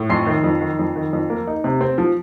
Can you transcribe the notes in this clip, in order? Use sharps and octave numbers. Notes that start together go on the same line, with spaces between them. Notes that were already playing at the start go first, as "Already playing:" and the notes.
Already playing: A2
F2 C6 C7
D#3
F2
D#3
F2
D#3
F2
A#3
D#4
C3
C4
F3